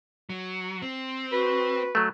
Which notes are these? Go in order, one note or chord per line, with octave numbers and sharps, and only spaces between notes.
F#3
C4
F#4 B4
F#3 A3